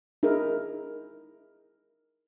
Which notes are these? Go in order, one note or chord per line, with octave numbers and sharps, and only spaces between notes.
D#4 E4 G#4 A#4